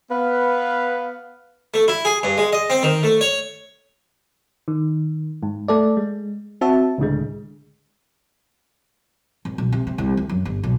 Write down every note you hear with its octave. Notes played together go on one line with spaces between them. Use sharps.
B3 B4 F5
A3
E4
G#4
G2
G#3
D#5
C4
D#3
A3
C#5
D#3
G#2
A3 A4 D5
G#3
C4 F#4 E5 A5
C#2 A2 D3 G#3
G#1
B1
C3
C3
C2
D2
F#2
G1
B1